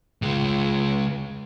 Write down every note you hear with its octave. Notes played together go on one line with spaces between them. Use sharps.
C#2 G#3